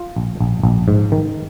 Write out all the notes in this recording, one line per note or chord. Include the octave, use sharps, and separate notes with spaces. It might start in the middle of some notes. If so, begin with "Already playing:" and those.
Already playing: F4
A#1
A#1
A#1
G#2
D#3